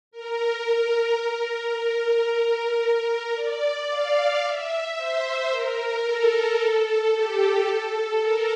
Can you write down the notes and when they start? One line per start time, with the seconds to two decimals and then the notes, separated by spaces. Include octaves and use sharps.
0.11 A#4
1.19 A#4
3.35 D5
3.90 F5
4.43 E5
4.97 C5
5.51 A#4
6.05 A4
7.13 G4
7.67 A4
8.21 A#4